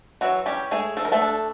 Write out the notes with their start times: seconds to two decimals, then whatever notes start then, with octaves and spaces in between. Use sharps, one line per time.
0.21 E3 F#3 F#4
0.46 G3 C#4 G4
0.71 G#3 A3 G#4
0.97 F3 A4
1.05 A#4
1.12 A3 A4
1.22 D4